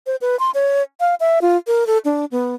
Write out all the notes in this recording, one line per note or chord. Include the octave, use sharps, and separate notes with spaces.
C5
B4
C6
C#5
F5
E5
F4
A#4
A4
D4
B3